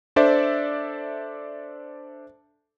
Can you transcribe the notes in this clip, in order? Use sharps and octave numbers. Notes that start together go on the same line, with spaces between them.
D4 A4 C5 D5 E5